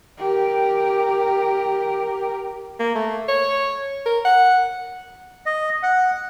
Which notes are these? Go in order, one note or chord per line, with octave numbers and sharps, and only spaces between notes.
G4 A#4
A#3
A3
C#5
A#4
F#5
D#5
F#5